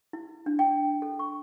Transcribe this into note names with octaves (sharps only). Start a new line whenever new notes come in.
E4
D4
G5
A4
C#6